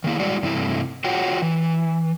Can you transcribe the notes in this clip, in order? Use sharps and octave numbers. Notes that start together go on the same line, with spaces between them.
D#3 A#3 E4
G3 G#3 E4 F#4 D5
G2 C3 E3 A3 E4
F4 F#4 C#5 F#5 G5
E3